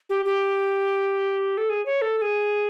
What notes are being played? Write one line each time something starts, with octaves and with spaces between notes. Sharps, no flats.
G4
G4
A4
G#4
C#5
A4
A4
G#4